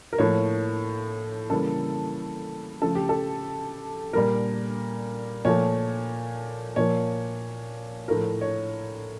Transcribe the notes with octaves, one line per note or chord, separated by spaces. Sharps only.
A#4
A2 F3 A#3 C#5
C#3 E3 G3 A#3 A4
C#3 F3 A3 A4
G4
A4
A#2 G3 A#3 A#4
A#2 F3 A3 C#5
A#2 F3 A#3 C#5
A2 F3 A3 A#4
C#5